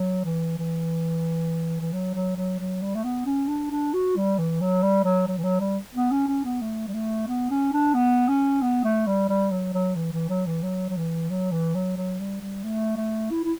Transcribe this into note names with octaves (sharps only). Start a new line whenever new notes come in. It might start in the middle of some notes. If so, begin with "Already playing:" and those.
Already playing: F#3
E3
E3
E3
F#3
F#3
F#3
F#3
G3
A3
B3
C#4
D4
D4
F#4
G3
E3
F#3
G3
F#3
F#3
E3
F#3
G3
B3
C#4
C#4
B3
A3
G3
A3
B3
C#4
D4
B3
C#4
B3
A3
G3
G3
F#3
F#3
E3
E3
F#3
E3
F#3
F#3
E3
F#3
E3
F#3
F#3
G3
G3
A3
A3
E4
E4